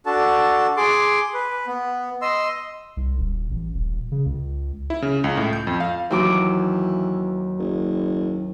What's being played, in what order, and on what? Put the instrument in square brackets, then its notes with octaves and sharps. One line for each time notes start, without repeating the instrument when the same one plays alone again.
[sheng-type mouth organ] D4 F#4 A4 A5
G#4 C6 D6
B4
B3
D#5 C6 E6
[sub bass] C2
D#1
A1
D#1
C#3
C#2
[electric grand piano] E4
C#3
C#2
A2
G6
F2
F5
[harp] D#2 F#3 D6 [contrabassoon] E3
[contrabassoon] F#1